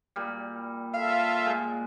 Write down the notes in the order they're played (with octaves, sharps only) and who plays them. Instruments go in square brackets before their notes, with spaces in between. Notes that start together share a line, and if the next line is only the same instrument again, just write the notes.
[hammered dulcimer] A#2 G3
[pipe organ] F4 A4 E5 [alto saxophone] F5
[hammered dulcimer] A#2 G#3